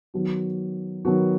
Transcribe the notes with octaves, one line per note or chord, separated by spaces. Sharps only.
D#3 F#3 B3 F#4
D#3 F#3 B3 F#4